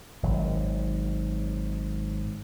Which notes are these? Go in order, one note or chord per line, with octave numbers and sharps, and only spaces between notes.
G#1 F#3